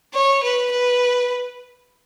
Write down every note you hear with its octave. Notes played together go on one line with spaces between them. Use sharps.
C#5
B4
B4